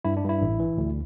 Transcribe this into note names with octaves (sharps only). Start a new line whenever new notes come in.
G2 E4
D4
G2
E4
A1
E3
D2